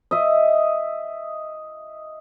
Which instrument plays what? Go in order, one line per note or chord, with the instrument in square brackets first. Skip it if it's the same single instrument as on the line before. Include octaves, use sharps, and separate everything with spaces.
[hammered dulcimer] D#5 E5